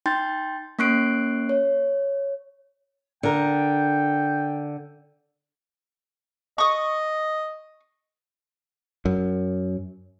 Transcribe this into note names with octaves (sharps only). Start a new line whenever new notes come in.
D#4 G5 C6 G6 A6
A#3 C#4 C#6 F#6 C7 D7
C#5
D3 A#4 G5
D#5 C#6 D#6
F#2